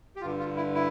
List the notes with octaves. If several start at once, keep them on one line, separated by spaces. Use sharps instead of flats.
G4
G2 D3 F4
F4
E4
E4